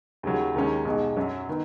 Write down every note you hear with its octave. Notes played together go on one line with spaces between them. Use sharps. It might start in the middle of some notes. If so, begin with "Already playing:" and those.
D#2 C#3 F#3
D#2 D#3 G#3 C#4
B1 B2 G#3
F#2 F#3 C#4
D#3 B3